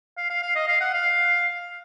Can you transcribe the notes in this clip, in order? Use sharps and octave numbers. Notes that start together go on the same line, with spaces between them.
F5
F5
F5
D#5
F5
F#5
F5